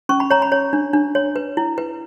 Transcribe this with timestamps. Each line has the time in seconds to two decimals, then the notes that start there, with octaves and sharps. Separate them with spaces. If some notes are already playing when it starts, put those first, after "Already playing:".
0.09 C#4 C#6
0.20 B5
0.30 C#5 A#5
0.42 B5
0.52 C#5
0.73 D4
0.93 D4
1.15 C#5
1.36 B4
1.57 E4
1.78 B4